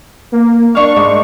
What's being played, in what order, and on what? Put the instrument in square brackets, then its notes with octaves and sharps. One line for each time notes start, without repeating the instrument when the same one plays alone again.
[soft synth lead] A#3
[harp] D4 F5 [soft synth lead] C#6
[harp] G#2